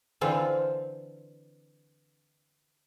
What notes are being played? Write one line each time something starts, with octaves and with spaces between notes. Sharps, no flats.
D3 E3 C4 F4